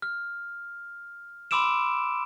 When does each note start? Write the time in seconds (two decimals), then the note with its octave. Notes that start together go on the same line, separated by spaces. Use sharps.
0.02 F6
1.51 B5 C6 D6 E6 D7 E7